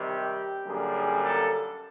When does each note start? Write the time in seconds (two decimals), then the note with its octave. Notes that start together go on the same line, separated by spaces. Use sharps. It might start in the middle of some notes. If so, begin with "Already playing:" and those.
Already playing: C3 D#3 G3
0.09 G4
0.65 F#2 D3 G3 A#3 G#4
1.22 A4